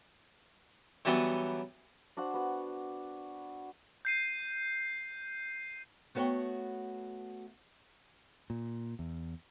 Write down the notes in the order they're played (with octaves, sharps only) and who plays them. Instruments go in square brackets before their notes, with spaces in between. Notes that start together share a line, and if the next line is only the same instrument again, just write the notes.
[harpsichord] D3 E3 F#3 G3 B3
[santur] D4 F#4 C5 F#5
B3 F#4
[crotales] G6 C7 D#7
[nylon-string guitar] A3 B3 F#4 C#5 F#5 G5
[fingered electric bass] A#2
E2